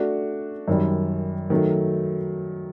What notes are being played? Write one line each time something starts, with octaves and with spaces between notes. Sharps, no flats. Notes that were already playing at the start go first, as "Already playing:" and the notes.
Already playing: A3 D4 F#4
F#2 D#3 G3
D#3 F#3 A3